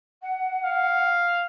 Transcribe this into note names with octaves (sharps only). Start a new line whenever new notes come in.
F#5
F5